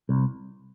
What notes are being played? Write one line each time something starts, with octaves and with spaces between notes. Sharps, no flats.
C2